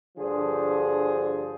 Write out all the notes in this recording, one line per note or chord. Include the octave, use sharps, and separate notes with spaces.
G2 D3 F3 G#4 C5